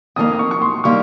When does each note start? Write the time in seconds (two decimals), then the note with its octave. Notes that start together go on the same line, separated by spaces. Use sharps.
0.16 F2 D#3 G3 A#3 D#6
0.33 D#6
0.39 C#6
0.51 C#6
0.62 C6
0.84 D#3 G3 A#3 C#6